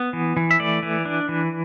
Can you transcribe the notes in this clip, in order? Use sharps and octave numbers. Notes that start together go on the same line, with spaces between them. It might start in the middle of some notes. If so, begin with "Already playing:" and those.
Already playing: B3
E3
E3
E5
A3 D5
E3
D4
E3